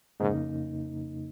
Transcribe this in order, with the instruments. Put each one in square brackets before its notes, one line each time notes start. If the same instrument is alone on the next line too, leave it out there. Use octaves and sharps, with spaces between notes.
[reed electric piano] F2 C#3 A#3 D#4 [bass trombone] G#2